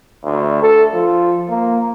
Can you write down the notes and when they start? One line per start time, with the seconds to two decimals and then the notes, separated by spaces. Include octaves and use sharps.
0.24 D2
0.62 A4
0.94 F3
1.49 A#3